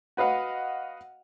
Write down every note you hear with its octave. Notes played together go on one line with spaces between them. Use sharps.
F#4 B4 D#5 F5 F#5